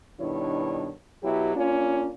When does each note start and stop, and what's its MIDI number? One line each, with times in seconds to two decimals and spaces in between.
0.20 0.89 43
0.20 0.89 47
0.20 0.89 51
0.20 0.89 62
0.20 0.89 64
0.20 0.89 73
1.23 1.52 47
1.23 1.52 54
1.23 1.52 64
1.23 1.52 67
1.56 2.10 58
1.56 2.10 61
1.56 2.10 62
1.56 2.10 65